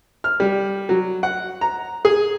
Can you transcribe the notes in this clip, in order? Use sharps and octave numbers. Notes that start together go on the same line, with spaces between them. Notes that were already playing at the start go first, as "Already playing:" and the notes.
F6
G3
F#3
F#5
A#5
G#4